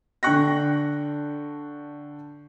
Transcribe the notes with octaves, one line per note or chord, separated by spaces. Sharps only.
D3 D4 G5 C#6 F#6 A#6